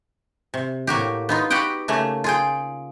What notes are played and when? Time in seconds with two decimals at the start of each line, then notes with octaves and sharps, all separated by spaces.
0.54 C3
0.87 A2 A#3 F#4 G4
1.29 B3 D#4 F4
1.50 F#4 G4 B4 F#5 G5
1.88 C#3 A3 A#3
2.24 F4 G#4 G5